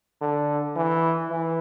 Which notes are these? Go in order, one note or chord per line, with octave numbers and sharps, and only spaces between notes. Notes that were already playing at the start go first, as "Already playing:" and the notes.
D3
E3
E3